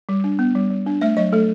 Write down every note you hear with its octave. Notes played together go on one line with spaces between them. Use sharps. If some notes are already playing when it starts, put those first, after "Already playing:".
G3
D4
B3
G3
G3
D4
A3 E5
F#3 D#5
A3 A4